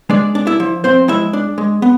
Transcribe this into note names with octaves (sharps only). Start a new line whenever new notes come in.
G#3 D4 D5
D4
E4 E5
F3
F3 C4 C5
G#3 E4 E5
D4
G#3
B3